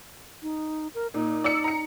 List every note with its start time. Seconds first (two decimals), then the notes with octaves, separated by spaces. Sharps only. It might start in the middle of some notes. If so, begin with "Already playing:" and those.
0.43 D#4
0.95 A#4
1.14 A#2 D#4
1.44 D5 E6 C#7
1.64 A#5 C#7